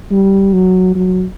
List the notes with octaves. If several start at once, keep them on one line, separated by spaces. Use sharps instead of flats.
G3
F#3
F#3